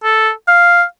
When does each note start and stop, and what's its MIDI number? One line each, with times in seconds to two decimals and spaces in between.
0.04 0.30 69
0.48 0.83 77